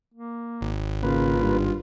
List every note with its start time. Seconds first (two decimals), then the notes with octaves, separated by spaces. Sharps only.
0.14 A#3
0.61 G#1
1.03 C#3 A#3 F4 B4
1.41 G2